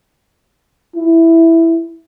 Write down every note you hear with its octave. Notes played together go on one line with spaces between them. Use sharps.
E4